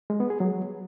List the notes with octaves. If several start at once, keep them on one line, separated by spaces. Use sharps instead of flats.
G#3
B3
G#4
F#3